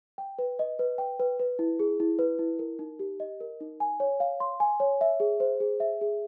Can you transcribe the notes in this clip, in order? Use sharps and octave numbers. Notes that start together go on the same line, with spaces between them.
G5
B4
D#5
B4
G5
B4
B4
E4
G#4
E4
B4
E4
A#4
D#4
G4
D#5
A#4
D#4
G#5
C#5
F5
C6
G#5
C#5
E5
G#4
C5
G#4
E5
G#4